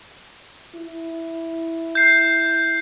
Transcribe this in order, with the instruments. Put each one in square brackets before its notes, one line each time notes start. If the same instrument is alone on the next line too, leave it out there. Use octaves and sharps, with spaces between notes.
[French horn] E4
[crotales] G6 C7